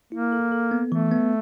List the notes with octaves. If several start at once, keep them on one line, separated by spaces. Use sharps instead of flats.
A#3 E4
A4
A4
B3
E3 A3
B3